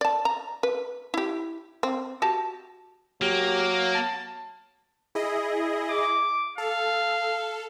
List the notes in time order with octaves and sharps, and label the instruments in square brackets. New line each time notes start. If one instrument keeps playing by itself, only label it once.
[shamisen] D5 A5
A#5
B4
E4 G4
C4
F#4 G4 A5
[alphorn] F#3 [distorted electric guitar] A#3 [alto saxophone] G4
[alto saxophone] A5
[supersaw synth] E4 G#4 D#5
[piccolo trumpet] D6
[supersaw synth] A4 [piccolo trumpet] F5